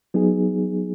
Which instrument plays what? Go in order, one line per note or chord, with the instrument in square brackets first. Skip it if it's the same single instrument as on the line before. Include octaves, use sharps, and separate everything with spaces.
[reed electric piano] F#3 B3 D#4 G#4